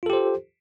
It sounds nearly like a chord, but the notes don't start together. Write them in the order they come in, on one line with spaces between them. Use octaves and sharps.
F4 A4 G4 C5